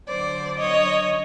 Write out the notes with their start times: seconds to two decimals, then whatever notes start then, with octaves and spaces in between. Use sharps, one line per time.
0.08 D3 F#3 C5 D5
0.59 C#5 D#5